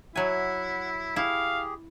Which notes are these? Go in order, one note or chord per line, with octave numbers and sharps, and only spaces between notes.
F#3 E4 E5 F#5 G#5
E4 G4 G#4 F5